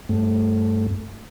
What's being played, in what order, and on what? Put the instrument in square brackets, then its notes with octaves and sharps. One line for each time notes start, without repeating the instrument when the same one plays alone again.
[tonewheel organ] G2 A3